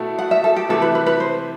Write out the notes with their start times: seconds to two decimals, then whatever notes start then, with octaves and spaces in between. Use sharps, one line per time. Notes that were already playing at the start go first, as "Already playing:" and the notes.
Already playing: B2 A3 E4 A4
0.19 F#5
0.31 E5
0.44 A4
0.56 G4
0.69 C3 E3 A3 E4 A4
0.82 B4
0.95 B4
1.06 B4
1.20 C5